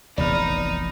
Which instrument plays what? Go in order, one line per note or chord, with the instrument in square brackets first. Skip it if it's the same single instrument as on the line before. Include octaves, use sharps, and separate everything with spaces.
[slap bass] F1 A#1 E3 [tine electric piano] E2 [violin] D#4 [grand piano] D5 B5 F6